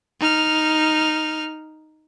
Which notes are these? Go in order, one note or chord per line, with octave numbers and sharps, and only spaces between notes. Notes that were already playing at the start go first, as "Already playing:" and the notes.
D#4 F6